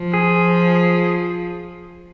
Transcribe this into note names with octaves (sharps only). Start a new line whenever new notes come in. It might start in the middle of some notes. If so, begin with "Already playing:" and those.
Already playing: F3
G#4